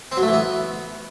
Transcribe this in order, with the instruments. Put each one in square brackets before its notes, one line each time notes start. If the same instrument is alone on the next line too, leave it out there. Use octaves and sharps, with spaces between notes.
[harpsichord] C4
F#3
A3
E3
B3